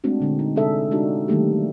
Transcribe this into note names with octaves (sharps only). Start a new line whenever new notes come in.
G#3 A3 C4 D4 F#4
A#2 D3 G#3
D#4
C3 G#3 D4 G#4 A4 E5
G#3 D4 D#4 F#4 G4
D#3 F#3 G3 A3 A#3 G4